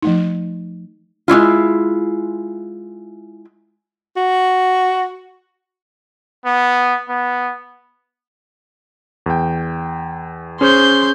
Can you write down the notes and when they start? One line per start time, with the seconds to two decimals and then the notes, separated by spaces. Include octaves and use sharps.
0.02 F3 A3 D#4
1.28 G#3 C#4 E4 F4
4.17 F#4
6.45 B3
7.09 B3
9.26 E2 G5
10.61 C#4 G#4 C5 C6 G6